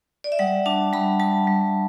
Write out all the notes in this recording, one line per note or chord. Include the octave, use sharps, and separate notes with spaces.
D5
E5
G3 F#5
D4 A5
G3 B5
G3 A5
G3